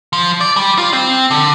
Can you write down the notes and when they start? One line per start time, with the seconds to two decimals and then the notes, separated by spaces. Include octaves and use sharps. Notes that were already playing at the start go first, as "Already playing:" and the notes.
0.13 F3
0.41 D5
0.57 G3
0.78 F4
0.93 C4
1.31 D3